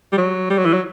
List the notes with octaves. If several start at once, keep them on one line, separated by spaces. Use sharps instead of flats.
G3
F#3
G3
F#3
E3
F#3